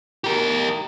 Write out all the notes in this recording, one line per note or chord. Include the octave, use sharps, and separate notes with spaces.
G4 A#4